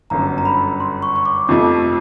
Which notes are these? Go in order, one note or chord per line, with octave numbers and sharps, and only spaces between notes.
G1 F#2 D3 A#5
A#5
B5
C6
C#6
C#6
D6
F2 C3 F3 A3 D6